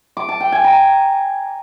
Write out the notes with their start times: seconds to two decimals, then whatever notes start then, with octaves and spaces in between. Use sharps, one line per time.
0.17 D6
0.29 A5
0.40 G5
0.52 G#5
0.64 A#5